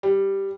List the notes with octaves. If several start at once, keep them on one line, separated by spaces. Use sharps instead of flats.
G3